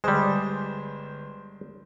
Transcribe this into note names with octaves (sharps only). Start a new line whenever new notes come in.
G1 G3 G#3 C5